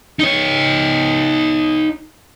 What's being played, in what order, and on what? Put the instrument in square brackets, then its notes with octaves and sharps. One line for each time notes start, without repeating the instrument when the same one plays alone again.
[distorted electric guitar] D#4 C#5